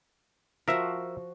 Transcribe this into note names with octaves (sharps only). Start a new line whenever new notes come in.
F3 F#4 A#4 E5